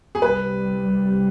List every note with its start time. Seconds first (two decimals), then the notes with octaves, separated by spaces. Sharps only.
0.15 G#4
0.22 C2 C3 G3 B4